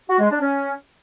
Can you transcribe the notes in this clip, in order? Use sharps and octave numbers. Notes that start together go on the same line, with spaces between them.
F#4
G#3
D4
C#4